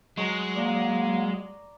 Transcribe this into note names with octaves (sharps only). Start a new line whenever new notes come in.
F#3 G#3 A#5 C#6
A#3 D5